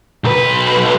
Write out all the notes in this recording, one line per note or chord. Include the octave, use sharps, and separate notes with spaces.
B1 B4